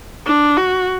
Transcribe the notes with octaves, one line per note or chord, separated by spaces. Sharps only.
D4
F#4